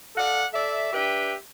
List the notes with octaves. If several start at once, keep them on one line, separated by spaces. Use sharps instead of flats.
A4 D5 F5 F#5
A4 D5 E5
D4 G4 B4 E5 G5